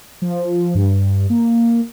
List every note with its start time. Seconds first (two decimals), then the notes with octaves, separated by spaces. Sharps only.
0.22 F3
0.75 G2
1.30 A#3